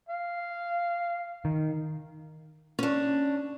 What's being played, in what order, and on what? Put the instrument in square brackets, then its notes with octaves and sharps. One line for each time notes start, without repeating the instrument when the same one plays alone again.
[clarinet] F5
[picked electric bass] D#3
[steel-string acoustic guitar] C#4 D4